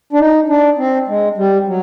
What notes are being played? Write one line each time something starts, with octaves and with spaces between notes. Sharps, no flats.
D4
D#4
D4
C4
G#3
G3
F#3